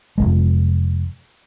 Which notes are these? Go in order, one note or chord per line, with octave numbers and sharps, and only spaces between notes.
F1 E2 G#3